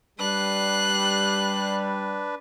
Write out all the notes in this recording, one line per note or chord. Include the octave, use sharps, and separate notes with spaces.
G3 D4 B4 F#6 C7